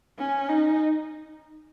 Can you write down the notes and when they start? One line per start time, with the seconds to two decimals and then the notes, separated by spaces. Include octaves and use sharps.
0.19 C#4
0.49 D#4